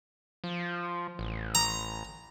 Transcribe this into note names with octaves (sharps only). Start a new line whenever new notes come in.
F3
A1
A#5